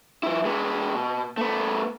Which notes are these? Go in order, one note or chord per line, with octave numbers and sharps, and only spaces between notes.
F3 E4
G#3 B3
B2
A3 B3